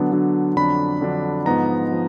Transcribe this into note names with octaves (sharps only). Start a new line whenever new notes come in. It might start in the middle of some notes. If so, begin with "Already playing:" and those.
Already playing: D3 F#3 B3 D4
D3 F#3 B3 D4
F2 D3 F#3 D4 B5
F2 D3 F#3 D4
G#2 F3 B3 D#4 A#5
F3